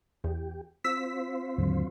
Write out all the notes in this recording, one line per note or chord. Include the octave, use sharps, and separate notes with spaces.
E2 G4
C4 F4 C5 E6 B6
D#2 G#2 D3 F#3